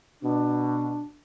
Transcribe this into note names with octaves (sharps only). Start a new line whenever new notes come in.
B2 D4